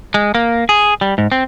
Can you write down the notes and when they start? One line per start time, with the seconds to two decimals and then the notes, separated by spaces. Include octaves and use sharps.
0.14 G#3
0.35 A#3
0.69 G#4
1.01 G3
1.18 G#2
1.32 C4